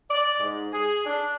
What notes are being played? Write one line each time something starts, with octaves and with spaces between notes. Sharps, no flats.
D5
G#2
G#4
D4